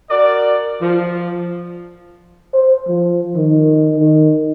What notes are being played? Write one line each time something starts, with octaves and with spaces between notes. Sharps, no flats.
F#4 A#4 D5
F3
C5
F3
D#3
D#3